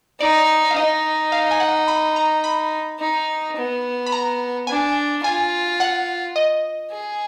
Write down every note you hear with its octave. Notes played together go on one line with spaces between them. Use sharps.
D#4 D5
F5
D#4 D#5
F5
G#5
F#5
B5
A#5
B5
D#4
B3
B5
A#5
D4 G#5
F4 G#5
F#5
D#5
G#4